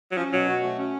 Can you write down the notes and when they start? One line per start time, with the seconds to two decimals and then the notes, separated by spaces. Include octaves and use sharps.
0.11 F#3
0.17 F3 C#4
0.33 B2 F#3
0.48 F#4
0.63 A3
0.78 C#4